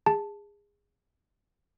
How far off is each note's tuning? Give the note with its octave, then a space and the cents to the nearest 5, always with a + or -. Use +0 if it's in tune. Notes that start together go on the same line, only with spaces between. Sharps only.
G#4 -20 A5 +0